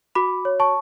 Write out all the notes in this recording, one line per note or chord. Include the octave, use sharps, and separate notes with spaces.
F#4 B5 D6
C#5
A5 C#6